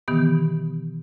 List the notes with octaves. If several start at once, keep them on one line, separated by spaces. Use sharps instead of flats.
B2 D#3 E3 B3 G4